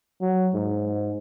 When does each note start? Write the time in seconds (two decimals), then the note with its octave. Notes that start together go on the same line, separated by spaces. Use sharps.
0.21 F#3
0.54 G#2